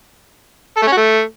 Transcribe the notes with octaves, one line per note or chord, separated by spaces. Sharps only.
A4
A3
C#4
F#4
A3